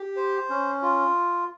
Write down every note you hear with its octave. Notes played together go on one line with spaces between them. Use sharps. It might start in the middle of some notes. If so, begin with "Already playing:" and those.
Already playing: G4
C5
C#4
F4